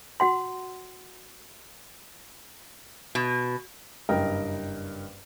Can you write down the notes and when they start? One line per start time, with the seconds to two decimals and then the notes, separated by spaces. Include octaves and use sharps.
0.20 F#4 F#5 C6
3.15 B2
4.09 F#1 G2 A#4 D#5 G5